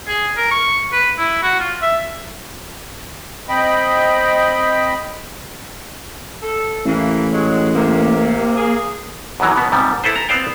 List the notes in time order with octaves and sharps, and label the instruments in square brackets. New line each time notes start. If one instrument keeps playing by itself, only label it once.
[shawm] G#4
A#4
C#6
B4
E4
F#4
F4
E5
[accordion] C4 D#5 G5 B5
[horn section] A4
[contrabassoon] A1 [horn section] E3 A#3
[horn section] F#3 G#3
[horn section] C3 [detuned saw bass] A#3
[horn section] G#4
[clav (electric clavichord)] F#2 B2 D#3 E3 F#3
B2 B3
G#2 C3 F3 G3
E4 A4 B4 C5
A#5
B3 C4 C5 D5 F5 G5